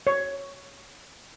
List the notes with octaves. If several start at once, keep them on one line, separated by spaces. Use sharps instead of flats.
C#5